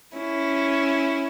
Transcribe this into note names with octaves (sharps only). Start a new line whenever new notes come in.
C#4 E4